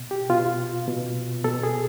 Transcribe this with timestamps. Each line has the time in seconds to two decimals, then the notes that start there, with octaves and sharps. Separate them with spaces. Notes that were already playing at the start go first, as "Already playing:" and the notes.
Already playing: B2
0.11 G4
0.30 B2 F4
0.88 B2
1.44 B2 A4
1.63 G#4